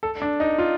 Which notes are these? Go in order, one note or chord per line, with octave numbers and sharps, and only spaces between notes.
A4
D4
D#4
F4